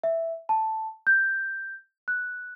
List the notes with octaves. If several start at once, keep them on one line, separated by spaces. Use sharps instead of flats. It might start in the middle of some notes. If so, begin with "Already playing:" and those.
E5
A5
G6
F#6